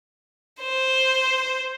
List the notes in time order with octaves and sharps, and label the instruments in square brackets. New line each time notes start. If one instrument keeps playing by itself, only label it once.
[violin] C5